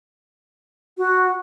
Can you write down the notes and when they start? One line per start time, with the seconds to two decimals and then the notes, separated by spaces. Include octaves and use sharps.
0.98 F#4